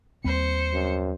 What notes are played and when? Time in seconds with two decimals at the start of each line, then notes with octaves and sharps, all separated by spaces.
0.24 D#2 G3 C4 C5 C#7
0.74 F#2